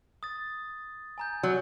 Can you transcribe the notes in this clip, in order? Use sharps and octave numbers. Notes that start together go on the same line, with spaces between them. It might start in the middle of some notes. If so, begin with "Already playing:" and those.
D#6 A6
G#5 A#5 G6
F#3